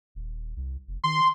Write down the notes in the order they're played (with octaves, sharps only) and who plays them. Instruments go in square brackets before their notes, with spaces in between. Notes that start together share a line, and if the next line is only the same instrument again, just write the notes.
[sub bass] D#1
C2
F1
[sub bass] D#3 [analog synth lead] C6